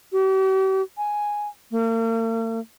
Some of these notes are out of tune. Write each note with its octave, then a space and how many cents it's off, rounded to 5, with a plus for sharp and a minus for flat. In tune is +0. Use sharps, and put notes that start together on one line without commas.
G4 -45
G#5 +0
A#3 -45